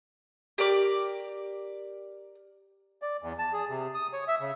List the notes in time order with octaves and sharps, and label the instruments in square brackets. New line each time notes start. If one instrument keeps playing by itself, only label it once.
[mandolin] G4 A#4 D5 D6
[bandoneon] D5
E2
A5
G#4
C3
D#6
C#5
E5
C#3